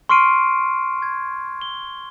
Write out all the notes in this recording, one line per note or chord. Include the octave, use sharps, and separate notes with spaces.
C6 C#6 F6 C7 D7 D#7
G#6
G7